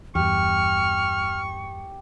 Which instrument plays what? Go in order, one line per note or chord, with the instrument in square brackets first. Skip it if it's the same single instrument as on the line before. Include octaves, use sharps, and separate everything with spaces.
[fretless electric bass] E2 G2 [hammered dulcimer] G4 [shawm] C#6 [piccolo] F6